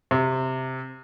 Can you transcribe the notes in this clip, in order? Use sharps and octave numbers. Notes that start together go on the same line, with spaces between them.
C3